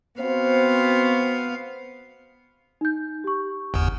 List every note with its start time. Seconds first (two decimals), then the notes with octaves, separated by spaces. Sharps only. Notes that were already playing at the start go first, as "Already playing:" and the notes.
0.20 B3 C4 F#4 C5 F5
2.81 D#4 G6
3.24 G4 C#6
3.74 G1 E2